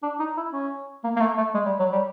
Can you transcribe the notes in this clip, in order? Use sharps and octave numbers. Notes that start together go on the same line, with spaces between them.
D4
D#4
E4
C#4
A#3
A#3
A3
A3
G#3
G3
F#3
G3